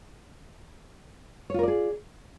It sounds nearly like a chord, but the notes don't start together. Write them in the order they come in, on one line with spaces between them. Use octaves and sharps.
C#5 F4 A#4 D5 G#4